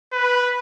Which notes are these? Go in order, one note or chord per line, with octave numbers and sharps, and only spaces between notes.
B4